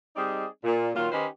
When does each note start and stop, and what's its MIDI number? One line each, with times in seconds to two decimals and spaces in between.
0.16 0.45 55
0.16 0.45 60
0.16 0.45 63
0.16 0.45 68
0.16 0.45 74
0.16 0.45 75
0.64 0.89 46
0.95 1.09 46
0.95 1.09 51
0.95 1.09 54
0.95 1.09 65
1.12 1.26 51
1.12 1.26 61
1.12 1.26 63
1.12 1.26 67
1.12 1.26 71
1.12 1.26 72